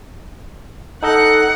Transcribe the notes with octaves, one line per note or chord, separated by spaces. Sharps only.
D#4 A4 D#5 F#5